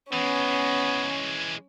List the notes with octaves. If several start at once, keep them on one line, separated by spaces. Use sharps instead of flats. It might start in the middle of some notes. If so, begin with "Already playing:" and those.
E3 G#3 B3 C#4